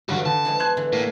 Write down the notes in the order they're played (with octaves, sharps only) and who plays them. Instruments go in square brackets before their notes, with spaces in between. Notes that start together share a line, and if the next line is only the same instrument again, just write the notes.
[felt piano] G2 D3 [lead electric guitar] F#4 C#5 [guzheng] B4
[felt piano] D3 [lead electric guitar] A5
[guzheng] E3 F3 G#3
[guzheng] B3 [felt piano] C6 F#6 G#6
[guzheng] D3 E3 A3
[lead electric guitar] A2 [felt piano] A#3